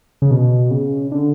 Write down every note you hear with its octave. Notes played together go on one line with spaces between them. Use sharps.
C#3
B2
C#3
D3